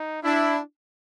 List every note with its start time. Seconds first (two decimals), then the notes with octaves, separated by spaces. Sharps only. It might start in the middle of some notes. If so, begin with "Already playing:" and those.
Already playing: D#4
0.23 D4 E4